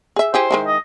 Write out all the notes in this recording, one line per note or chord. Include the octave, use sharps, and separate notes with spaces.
G#4 E5
E4 G4 G#4 C5
D#3 G#3 E4
D#5